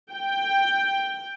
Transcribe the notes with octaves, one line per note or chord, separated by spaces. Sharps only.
G5